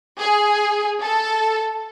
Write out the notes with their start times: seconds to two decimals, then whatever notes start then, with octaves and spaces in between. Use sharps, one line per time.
0.21 G#4
1.02 A4